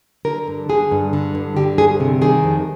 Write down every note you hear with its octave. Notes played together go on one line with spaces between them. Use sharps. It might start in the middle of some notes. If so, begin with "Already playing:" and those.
D3 A#4
G2
D3 G#4
G2
D3
G2
D3 G4
G2 G#4
C3
D#3 G#4
F2